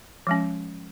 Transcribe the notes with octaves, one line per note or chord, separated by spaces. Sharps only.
F3 G#3 C#4